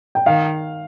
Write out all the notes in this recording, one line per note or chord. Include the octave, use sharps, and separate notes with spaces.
G5
D#3 F5